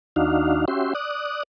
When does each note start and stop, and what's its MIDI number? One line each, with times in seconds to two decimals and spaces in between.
0.16 0.65 39
0.16 0.65 62
0.16 0.65 63
0.16 0.65 66
0.16 0.65 77
0.68 0.93 61
0.68 0.93 66
0.68 0.93 67
0.68 0.93 76
0.68 0.93 84
0.95 1.43 74
0.95 1.43 87
0.95 1.43 90